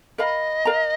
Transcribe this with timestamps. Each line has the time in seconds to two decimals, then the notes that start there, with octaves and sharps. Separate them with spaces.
0.18 A#4 D#5 F5 B5
0.65 A#4 F5 A#5